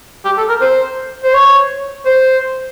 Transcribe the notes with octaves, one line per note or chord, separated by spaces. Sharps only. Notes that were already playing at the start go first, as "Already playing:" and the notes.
G4
A4
A#4
C5
C5
C#5
C5